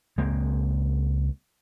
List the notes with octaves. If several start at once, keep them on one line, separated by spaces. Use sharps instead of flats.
C#2 G#3 A#3 C4